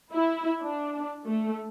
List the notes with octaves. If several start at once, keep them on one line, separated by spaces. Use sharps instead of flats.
E4
D4
A3